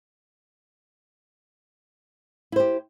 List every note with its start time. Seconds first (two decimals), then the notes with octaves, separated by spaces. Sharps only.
2.52 E4
2.56 C5
2.60 G4